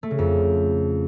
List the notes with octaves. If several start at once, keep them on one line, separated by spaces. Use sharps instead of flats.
A3
C#3
F2